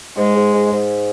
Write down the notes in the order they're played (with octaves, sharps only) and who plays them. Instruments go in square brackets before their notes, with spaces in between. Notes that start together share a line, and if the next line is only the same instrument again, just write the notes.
[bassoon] G#2 [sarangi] G#3
[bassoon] G#2
G#2
G#2